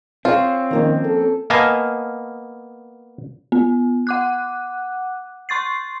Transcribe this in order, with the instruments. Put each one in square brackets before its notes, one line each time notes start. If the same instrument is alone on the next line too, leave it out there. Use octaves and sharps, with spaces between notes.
[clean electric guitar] C4 [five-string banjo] F4 [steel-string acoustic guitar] G#4 C#5
[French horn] D#3 [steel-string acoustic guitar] F3 A#3 C#4
[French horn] A4
[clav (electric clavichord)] A#3 B3 D#5 F5 G#5 A5
[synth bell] B3
F#5 D6 F#6
C6 C#6 A6 C7